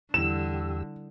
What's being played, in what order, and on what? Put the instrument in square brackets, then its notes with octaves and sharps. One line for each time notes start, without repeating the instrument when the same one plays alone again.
[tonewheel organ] E2 G4 E6 [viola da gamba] D3 [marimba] G3 E4 [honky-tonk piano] E7